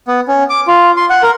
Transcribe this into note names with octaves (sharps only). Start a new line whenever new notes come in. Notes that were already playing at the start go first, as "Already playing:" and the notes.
B3
C#4
D6
F4
C6
F#5
A#4